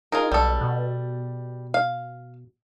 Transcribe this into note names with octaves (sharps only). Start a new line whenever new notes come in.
D#4 F4 G#4 A#4
B1 G3 A4
B2
F5